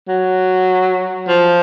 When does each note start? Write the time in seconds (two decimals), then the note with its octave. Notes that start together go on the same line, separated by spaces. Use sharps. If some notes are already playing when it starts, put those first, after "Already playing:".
0.08 F#3
1.28 F3